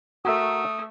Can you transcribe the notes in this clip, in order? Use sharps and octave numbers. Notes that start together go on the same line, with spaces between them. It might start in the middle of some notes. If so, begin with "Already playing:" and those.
A3 F#4 A#4 E5 D#6